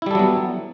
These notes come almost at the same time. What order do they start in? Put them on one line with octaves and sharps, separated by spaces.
E4 G3 A4 F#3 B3